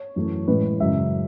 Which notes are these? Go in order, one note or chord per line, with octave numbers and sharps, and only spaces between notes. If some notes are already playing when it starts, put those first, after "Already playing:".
Already playing: C#5
F#2 E3 A3
A2 E3 G#3 B4
F#2 C#3 G#3 E5